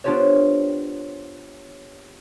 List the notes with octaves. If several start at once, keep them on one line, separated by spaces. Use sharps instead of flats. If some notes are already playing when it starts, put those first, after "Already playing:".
B3 D4 F4 G4 C5 C#5